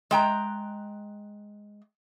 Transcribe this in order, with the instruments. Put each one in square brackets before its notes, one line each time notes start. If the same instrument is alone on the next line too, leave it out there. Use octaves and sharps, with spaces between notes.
[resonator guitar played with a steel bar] G#3 G5 A#5